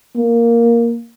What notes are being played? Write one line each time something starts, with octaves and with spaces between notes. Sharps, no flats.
A#3